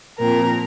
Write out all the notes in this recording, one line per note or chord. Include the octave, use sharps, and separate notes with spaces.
A#2 F3 C4 A#4